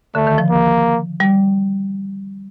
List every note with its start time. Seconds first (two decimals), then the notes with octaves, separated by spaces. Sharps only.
0.15 D3 A3
0.27 D#3
0.38 F3
0.50 A#3
1.20 G3